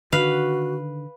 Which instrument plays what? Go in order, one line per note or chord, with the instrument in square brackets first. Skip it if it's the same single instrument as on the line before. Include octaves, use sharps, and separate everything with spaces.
[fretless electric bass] D3 D#3 [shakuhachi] F#4 [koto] B4 F5